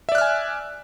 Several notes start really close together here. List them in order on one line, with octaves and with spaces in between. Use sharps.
E5 D5 F#6 F6 G#5